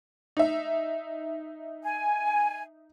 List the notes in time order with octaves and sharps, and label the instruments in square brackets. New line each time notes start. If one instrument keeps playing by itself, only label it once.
[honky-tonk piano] D#4 E5
[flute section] G#5